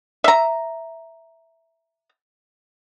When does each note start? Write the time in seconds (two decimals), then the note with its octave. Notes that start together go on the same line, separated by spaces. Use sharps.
0.24 E5 A#5